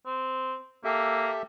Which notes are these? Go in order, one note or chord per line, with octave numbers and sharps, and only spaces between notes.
C4
A#3 G4 A4 E5